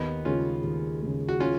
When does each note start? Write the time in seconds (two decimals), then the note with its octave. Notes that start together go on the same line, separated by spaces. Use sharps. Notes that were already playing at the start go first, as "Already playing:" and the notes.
Already playing: D#2 B3 D#4
0.25 C#3 G#3 C#4 F4
0.64 D#2
1.02 C#3 G#3
1.29 F#4
1.40 C#4 F4